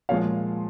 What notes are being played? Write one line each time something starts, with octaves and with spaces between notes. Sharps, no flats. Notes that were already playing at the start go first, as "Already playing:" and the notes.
A#2 F3 G#3 C#5 F5